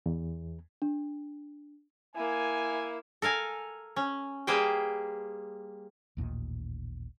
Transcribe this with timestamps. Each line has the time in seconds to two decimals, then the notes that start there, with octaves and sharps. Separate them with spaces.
0.06 E2
0.82 D4
2.16 A#3 E4 G#5
3.22 A4 A#4 F5 G#5
3.96 C#4
4.47 G3 A#3 G#4 B4 C5 G5
6.17 A1 D#2 A#2 D#3